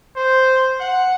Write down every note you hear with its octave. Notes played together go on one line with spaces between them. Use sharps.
C5
F#5